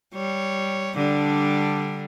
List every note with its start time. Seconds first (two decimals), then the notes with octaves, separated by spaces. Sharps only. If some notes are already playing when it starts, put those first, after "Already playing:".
0.14 G3 C#5
0.95 D3 G3 D4